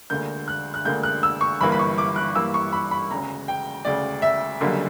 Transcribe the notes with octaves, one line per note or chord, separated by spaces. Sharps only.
E1 D2 D3 A#3 G6
F#6
F#6
E1 D2 D3 A#3 G6
F#6
E6
C#6
G1 G2 E3 A#3 B5
B5
C#6
D6
F#6
G1 G2 E3 A#3 E6
C#6
B5
B5
E1 D2 C#3 A#5
G5
E1 D2 C#3 D5
E5
F#1 F#2 D3 G3 A#3